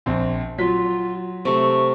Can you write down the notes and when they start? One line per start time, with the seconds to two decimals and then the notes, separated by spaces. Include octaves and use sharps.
0.06 A#1 C4
0.58 F#3 F4 B6
1.45 C3 A3 C#6